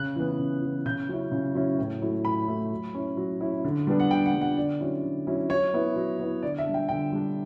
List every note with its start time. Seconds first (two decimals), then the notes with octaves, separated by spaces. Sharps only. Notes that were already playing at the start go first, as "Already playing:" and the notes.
Already playing: C#3 F#6
0.16 E3 B3
0.38 C#3
0.62 E3 B3
0.86 C#3 G6
1.09 F#3 C#4 E4
1.32 C#3
1.55 F#3 C#4 E4
1.79 A2
2.02 F#3 A3 E4
2.24 A2 B5
2.48 F#3 A3 E4
2.71 F#3
2.94 C#4 E4
3.17 F#3
3.41 C#4 E4
3.65 D3
3.87 G3 B3 D4
4.00 F#5
4.11 D3 G5
4.26 F#5
4.33 G3 B3 D4
4.41 F#5
4.57 D3 D5
4.80 F#3 C#4 E4
5.04 D3
5.27 F#3 C#4 E4
5.49 F#3 C#5
5.74 B3 E4
5.96 F#3
6.20 B3 E4
6.43 D3 D5
6.58 E5
6.65 G3 D4
6.74 G5
6.89 D3 G5
7.12 G3 D4